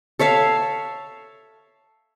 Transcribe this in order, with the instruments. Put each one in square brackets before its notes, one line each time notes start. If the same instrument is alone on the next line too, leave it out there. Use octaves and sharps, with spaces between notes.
[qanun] A4 C#5 E5 F5